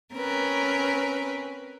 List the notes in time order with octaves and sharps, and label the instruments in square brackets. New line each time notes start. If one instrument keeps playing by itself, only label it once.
[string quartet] C4 C#4 A#4 B4